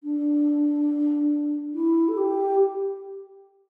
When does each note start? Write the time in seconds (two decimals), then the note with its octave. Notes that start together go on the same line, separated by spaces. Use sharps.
0.03 D4
1.74 E4
2.08 A4
2.17 G4